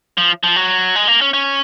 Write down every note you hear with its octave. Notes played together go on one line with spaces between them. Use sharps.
F3
F3
F#3
G#3
A#3
C#4
C#4